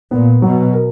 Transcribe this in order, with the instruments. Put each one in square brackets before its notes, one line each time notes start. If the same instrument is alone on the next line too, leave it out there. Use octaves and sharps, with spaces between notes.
[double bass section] A#2 [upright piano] B3
[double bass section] B2 [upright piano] F#3
[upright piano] A#4